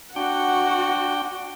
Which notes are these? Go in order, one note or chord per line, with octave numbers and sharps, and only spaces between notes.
D4 F#4 F#5 G5